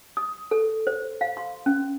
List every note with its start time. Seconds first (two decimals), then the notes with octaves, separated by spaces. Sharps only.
0.17 D#6
0.51 A4
0.87 C5
1.21 F5
1.37 C6
1.66 C#4